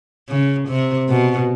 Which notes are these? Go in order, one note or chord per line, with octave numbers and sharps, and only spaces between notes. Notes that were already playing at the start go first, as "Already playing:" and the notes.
C#3
C3
B2